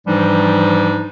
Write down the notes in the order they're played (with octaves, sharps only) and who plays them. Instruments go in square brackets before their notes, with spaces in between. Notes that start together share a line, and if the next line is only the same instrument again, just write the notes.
[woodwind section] G#2 E3 F3 G3 D4 D#4